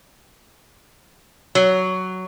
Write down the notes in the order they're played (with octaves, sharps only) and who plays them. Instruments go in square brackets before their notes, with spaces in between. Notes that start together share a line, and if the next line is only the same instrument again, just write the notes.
[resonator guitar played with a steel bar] F#3